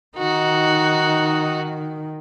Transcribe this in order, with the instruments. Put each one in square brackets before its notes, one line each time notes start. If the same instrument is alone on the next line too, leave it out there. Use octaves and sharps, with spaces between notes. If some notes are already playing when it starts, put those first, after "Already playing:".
[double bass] D#3 [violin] D#4 F#4